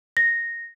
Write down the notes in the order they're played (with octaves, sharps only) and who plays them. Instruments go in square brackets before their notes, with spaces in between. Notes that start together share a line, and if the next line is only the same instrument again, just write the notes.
[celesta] A#6